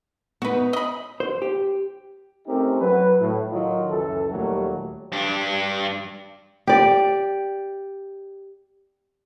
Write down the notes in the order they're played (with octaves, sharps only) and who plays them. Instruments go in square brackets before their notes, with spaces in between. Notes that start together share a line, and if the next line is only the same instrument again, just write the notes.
[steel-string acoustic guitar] B3 D#4 [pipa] F#4 B4
[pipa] D#5 B5
[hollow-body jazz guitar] C5
G4
[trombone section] A3 C4 C#4 D#4 G4 A#4
F#3 B4
A2
D#3 F#3 D#4 F4
C#2 F#2 E3 A4
D#2 A#2 F#3 G3 A3
[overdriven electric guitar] G2 D4
[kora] G4 D5